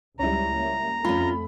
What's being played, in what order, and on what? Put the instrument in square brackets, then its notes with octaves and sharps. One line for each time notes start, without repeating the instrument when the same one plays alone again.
[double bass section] C#2 F#3 G3 [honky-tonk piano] C#4 E4 [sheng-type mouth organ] A#5
[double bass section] G3 A#3
[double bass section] F2 A3 [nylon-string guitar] C#4 F4 [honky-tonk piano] B5